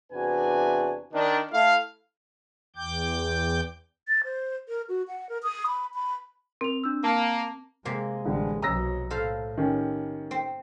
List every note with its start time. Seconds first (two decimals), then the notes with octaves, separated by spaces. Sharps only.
0.12 E2 C3 D4 F#4 B4 G#5
1.13 D#3 D4
1.52 A3 E4 F5
2.76 E2 G5 D6 G6
4.08 A6
4.24 C5
4.69 A#4
4.89 F#4
5.08 F#5
5.29 A#4
5.43 D#6
5.67 B5
5.94 B5
6.61 C4 A#4 F7
6.84 D4 E6
7.04 A#3 A5
7.85 C3 G#3 A#3
8.26 A1 D3 G3 G#3
8.62 B1 F#3 D#5 A#5 E6 A#6
9.10 A2 A4 C5 F5
9.57 D#3 C#4 G4
10.31 C4